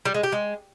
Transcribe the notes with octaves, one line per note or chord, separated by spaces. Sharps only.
G3
G#3
G4
G#3